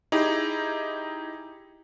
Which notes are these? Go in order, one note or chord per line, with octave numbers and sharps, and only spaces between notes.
D#4 E4 G4 G#4